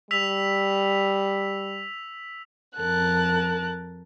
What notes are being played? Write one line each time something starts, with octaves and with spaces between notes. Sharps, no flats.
G3 E6 B6 F7
F2 A#4 A5 F#6